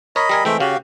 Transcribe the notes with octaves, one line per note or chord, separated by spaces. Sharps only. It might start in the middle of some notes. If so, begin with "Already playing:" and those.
A#4 C#5 D#5 B5
G3 A#4 G#5
E3 G#3 A3 C4 E5 G5
C#3 F#4 G4 F5